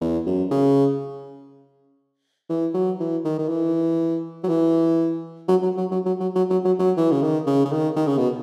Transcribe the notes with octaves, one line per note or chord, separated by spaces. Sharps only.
E2
F#2
C#3
E3
F#3
E3
D#3
D#3
E3
F#3
E3
F#3
F#3
F#3
F#3
F#3
F#3
F#3
F#3
F#3
F#3
E3
C#3
D#3
C#3
C#3
D#3
D#3
C#3
B2